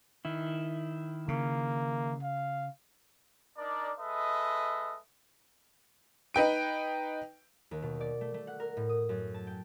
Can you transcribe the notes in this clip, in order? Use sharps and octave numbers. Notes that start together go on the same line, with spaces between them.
D#3 E4
C#3 A#3
F5
D4 D#4 A#4 D5
G#3 A4 B4 D#5 E5
D#4 B4 G5 D7
D#2
B2
D5
A3
A3
F#5
A#4
A2
D#6
F#2
A5
G5